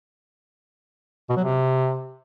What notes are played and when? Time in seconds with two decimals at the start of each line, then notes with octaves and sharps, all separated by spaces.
1.29 B2
1.37 F#3
1.44 C3